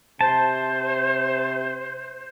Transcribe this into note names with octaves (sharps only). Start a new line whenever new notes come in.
C3 C5 A5